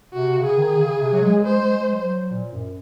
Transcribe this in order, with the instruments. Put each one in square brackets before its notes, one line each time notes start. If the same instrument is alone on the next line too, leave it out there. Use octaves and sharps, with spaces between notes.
[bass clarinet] C3 [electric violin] F#4
[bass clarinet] C#3
[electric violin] G#4
[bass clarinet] D#3
C#3
C3
F#3
G#3
[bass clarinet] G#3 [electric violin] C5
[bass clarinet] G#3
G#3
F#3
F#3
A#2
F#2